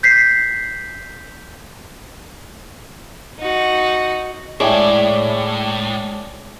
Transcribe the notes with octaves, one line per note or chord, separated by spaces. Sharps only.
G6 B6 C7
D#4 F#4
A2 G#3 D4 E4 G#4 C#5 G5 D6